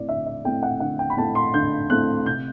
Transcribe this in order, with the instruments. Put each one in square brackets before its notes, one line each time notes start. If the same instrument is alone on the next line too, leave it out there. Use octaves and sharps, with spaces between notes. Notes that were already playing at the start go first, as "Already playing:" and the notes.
Already playing: [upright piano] A3 C4 E4 D5
D3 E5
E5
A3 C4 E4 G5
F#5
D3 F#5
G5
B5
A3 C4 E4 A5
C6
D3 G6
A3 C4 E4 F#6
C3 G6